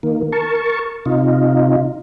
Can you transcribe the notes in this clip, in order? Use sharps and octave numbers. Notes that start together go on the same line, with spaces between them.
D#3 A#3
A#4 A5 C#6
C3 D#4 F4